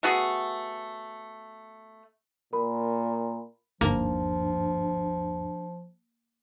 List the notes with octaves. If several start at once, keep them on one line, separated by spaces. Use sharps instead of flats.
A3 B3 F#4 G#4
A#2 A#4 B5
G1 D#2 G#2 F3 A#3 D4